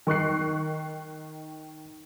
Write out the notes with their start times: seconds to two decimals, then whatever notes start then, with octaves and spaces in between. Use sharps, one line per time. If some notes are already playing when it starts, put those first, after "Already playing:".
0.07 D#3 C#6 F#6 C7